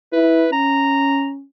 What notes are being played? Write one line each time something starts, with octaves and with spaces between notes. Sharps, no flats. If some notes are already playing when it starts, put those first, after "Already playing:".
E4 B4
C#4 A#5